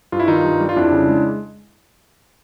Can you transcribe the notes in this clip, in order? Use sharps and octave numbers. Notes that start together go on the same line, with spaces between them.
G2 F4
E4
D#3 D#4 F4
G2
G3
F4
F2 D4 E4
C#3
G#3